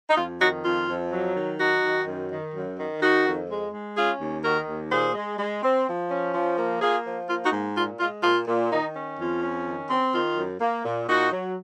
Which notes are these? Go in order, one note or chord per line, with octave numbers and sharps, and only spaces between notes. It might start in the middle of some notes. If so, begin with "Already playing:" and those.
D#4
F2 F4
D#3 D#4 F#4
F2 F4
F2
F#3
D#3
F#3 D#4 F#4
D#3
F#2
D#3
F#2
D#3
D#3 D#4 F#4
F2
G#3
G#3
C#4 F4 G#4
D#2
D#3 F#4 A#4
D#2
A#2 G#4 C5
G#3
G#3
C4
F3
C#4
F3
A#3
A#3 F4 G#4
F3
A#3 F4
D#4 F#4
G#2
A#2 F4
G#3 F4
A#2 F4
A#2
D#3 D#4
C#4
F2 F4
C#4
D#3
C4
D#3 F4
F#2
A#3
A#2
A#2 D#4 F#4
F#3